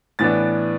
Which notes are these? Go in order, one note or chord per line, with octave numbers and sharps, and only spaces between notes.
A2 E3 B3 D4 A6